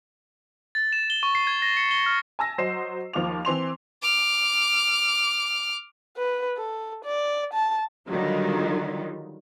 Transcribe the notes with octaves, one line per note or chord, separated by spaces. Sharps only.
A6
E7
G7
C#6
C7
G#6
A#6
C#7
G7
F6
G#5 A5 E6 A#6
F#3 C5 D#5 C7 E7
D#2 F3 F4 D6 F7
E3 C4 C6 F7
D6 F6
B4
A4
D5
A5
D3 D#3 F#3 G3 D#4 F4